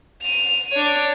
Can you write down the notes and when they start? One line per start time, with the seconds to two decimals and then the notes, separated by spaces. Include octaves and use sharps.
0.23 D#7 F7
0.72 D4 C#5